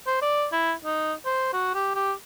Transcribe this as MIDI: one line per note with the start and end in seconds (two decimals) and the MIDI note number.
0.07 0.17 72
0.22 0.46 74
0.52 0.73 64
0.85 1.13 63
1.26 1.52 72
1.53 1.75 66
1.75 1.94 67
1.95 2.12 67